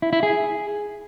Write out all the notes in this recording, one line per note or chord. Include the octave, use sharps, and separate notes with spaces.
E4
E4
G#4